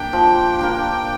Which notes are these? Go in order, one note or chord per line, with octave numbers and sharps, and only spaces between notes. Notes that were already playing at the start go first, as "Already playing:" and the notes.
Already playing: A#3 D4 G4 G5
F3
A#3 D4 G4